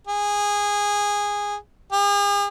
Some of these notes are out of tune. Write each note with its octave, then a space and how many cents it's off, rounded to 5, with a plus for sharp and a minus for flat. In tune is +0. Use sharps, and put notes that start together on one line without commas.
G#4 -15
G#4 -45